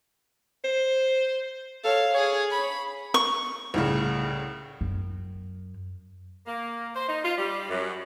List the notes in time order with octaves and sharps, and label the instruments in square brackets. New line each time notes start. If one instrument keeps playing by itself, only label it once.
[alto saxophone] C5
[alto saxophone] A4 [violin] C#5 F5
[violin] G#4 [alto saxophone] C#5
[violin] B5
[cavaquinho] C#6
[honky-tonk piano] C2 A2 C#3
[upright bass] F#2
[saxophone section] A#3
C5
D#4
F4
G3
F#2